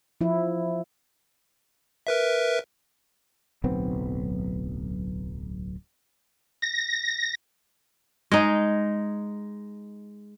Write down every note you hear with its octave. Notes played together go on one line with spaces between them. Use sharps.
F3 E4
A#4 B4 E5
D1 B1 B3 C4
A#6
G#3 D#4